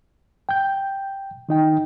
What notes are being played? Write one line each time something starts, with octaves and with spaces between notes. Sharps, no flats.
G5 G6
D#3 D#4 G5